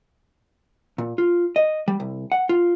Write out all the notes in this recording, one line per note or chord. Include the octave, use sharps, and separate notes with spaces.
A#2
F4
D#5
G3
C2
F#5
F4